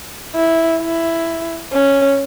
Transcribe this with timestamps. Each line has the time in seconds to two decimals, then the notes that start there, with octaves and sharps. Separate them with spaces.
0.35 E4
0.81 E4
1.73 C#4